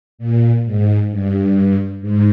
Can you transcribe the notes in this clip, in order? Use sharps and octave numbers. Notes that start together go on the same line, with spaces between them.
A#2
G#2
G2
G#2